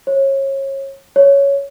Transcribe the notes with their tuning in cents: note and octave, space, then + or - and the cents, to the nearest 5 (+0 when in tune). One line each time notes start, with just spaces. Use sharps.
C#5 -30
C#5 +5